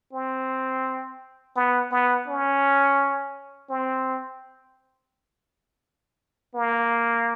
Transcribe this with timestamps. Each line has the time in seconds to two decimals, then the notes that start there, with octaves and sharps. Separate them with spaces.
0.13 C4
1.56 B3
1.92 B3
2.28 C#4
3.70 C4
6.55 A#3